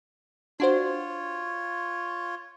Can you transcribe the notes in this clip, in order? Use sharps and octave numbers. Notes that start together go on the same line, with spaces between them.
D4 F4 F#4 C5 C#5